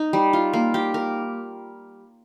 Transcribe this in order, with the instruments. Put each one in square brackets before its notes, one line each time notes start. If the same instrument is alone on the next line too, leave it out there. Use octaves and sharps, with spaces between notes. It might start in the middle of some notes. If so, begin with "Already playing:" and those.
Already playing: [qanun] D#4
G3
F4
A#3
G4
A#4